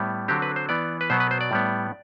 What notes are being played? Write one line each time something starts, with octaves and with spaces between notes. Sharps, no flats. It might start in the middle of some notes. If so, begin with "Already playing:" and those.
Already playing: A2 G3 B3
D3 F#3 C4 G4
B4
C5
E3 B3 D5
B4
B2 F#3 B3 C5
B4
C5
D5
A2 G3 B3